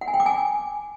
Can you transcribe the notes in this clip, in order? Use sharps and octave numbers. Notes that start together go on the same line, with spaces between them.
F#5
G#5
G5
D6
G#5